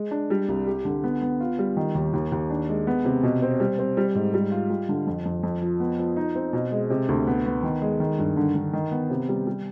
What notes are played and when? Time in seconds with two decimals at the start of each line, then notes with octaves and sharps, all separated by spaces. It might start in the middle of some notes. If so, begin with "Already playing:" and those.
Already playing: G#3
0.11 D4
0.30 G3
0.49 C2
0.67 G4
0.85 D3
1.04 B3
1.22 B3
1.40 F4
1.59 G3
1.77 D#3
1.95 D#2
2.13 D#2
2.32 D#2
2.50 D4
2.69 G#3
2.87 B3
3.05 C3
3.23 B2
3.42 C4
3.60 G3
3.79 C4
3.97 G3
4.15 G#2
4.34 G3
4.51 F4
4.70 G3
4.89 D3
5.07 F2
5.25 F2
5.43 F2
5.62 F3
5.80 B3
5.98 F3
6.17 D#4
6.35 C4
6.53 B2
6.71 G#3
6.90 C3
7.09 D2
7.27 B3
7.45 B3
7.63 D#3
7.82 G#3
8.00 D#3
8.18 G2
8.37 D3
8.55 D3
8.73 D#3
8.91 B3
9.10 C3
9.28 G3
9.47 G3